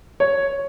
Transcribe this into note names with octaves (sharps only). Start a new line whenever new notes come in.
C#5